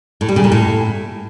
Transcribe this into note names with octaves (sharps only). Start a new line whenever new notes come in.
A2
G3
C#3
A#2
A2